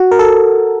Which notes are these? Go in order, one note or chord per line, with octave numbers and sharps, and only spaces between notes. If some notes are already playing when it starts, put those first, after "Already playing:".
Already playing: F#4
A#4
A4